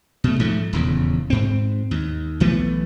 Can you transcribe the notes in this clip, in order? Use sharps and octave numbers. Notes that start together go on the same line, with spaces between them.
B2 A3
G#2 F3 A3
D#1 E2 C#3
G#2 C4
D#2
B1 E3 A3 B3